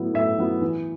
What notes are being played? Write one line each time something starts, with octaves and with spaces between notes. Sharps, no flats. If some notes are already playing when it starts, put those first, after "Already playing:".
Already playing: A2 F#3 B3 E4
A2 E5
F#3 B3 E4
E3